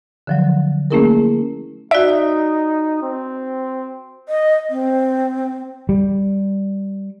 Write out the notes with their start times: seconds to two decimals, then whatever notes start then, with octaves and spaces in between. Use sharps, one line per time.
0.27 D3 F3 F#3
0.91 A3 A#3 C#4 E4 G#4 A#4
1.91 D#4 F#4 D5 E5
3.02 C4
4.28 D#5
4.70 C4
5.89 G3